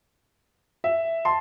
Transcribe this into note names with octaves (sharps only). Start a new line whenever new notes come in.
E5
A5 C6